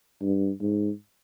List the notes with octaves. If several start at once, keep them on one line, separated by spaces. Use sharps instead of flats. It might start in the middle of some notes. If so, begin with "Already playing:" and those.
G2
G#2